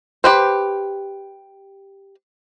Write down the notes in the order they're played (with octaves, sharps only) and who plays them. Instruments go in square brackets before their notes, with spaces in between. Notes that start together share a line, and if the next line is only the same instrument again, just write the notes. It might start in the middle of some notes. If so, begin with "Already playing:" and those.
[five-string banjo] G4 B4 C5